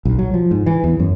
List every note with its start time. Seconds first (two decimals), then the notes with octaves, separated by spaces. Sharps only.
0.05 B1
0.19 F#3
0.34 F3
0.51 G#2
0.66 E3
0.84 E2
0.99 F#2